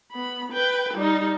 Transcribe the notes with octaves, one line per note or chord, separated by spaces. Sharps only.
B3 B5
B4 G5
G3 D#4